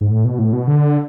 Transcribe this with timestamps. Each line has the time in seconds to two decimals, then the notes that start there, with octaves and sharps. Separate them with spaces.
0.01 G#2
0.11 A2
0.25 B2
0.39 A2
0.53 B2
0.67 D3